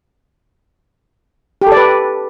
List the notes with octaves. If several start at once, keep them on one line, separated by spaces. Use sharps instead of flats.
G4
A4
D5
B4